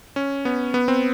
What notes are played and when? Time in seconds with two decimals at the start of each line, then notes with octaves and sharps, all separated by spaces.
0.16 C#4
0.45 B3
0.74 B3
0.88 C4